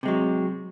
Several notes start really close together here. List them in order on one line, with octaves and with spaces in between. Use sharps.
C3 G#3 F#3